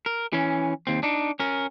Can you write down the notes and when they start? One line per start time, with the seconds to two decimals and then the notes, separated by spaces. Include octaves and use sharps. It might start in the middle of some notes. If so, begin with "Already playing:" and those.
0.06 A#4
0.33 E3 C#4
0.87 D#2 C4
1.03 D4 D#4
1.40 C#4 A#4